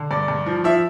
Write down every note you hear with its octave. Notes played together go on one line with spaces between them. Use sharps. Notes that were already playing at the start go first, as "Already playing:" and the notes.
Already playing: D3
G2 D5
G2
F3
F3 E5